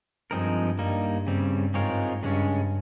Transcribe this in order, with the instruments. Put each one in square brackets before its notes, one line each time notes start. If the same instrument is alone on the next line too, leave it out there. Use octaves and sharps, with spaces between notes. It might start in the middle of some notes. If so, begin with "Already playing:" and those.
[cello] G2 [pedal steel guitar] F3 G#3 C4 D#4 A#4
[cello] G2 [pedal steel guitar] G3 A#3 D#4
[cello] G2 [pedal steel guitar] C#3 G3 C4
[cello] G#2 [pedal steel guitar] G#3 C4 F4 A#4 C#5
[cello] G2 [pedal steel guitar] C#3 G#3 C#4